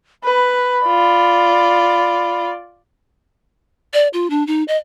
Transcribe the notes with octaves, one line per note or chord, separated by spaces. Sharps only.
B4 B5
F4 D5
D5
F4
D4
D#4
D#5